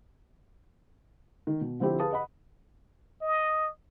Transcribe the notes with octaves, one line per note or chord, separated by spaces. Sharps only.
D#3
B2
D3 F3 C4 E4 G4
G#4 B4 F5 A5 D#6
D#5 F#5 B5
D#5